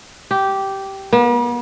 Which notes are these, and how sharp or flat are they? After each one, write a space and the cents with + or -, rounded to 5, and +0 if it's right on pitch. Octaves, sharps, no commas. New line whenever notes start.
G4 -10
B3 -45